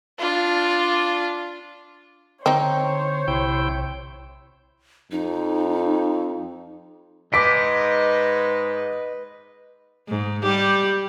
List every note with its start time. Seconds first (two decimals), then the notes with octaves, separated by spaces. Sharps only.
0.19 D4 F4
2.46 D3 C4 D#4 C5 C#5
3.28 B1 C3 E4 G5
5.11 F2 D#4
7.33 G#2 B4 D#5 D6 B6 D7
10.08 G#2
10.43 G3 G4